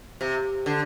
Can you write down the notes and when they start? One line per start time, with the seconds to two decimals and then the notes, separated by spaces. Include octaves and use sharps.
0.21 C3
0.66 D3